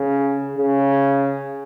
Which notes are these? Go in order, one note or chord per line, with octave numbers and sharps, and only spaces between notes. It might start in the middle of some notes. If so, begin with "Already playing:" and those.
Already playing: C#3
C#3